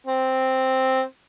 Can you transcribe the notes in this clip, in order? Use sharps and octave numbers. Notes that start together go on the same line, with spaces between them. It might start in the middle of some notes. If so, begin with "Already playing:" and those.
C4